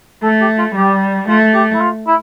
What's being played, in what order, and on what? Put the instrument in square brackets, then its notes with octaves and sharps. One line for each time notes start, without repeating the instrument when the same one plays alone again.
[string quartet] A3 [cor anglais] A4
[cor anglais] G4
F4
[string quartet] G3 [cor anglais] G4
[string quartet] A3 [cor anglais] F4
[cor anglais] G4
E4
F4
E4